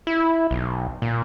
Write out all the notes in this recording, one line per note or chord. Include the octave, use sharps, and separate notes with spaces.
E4
B1
A#2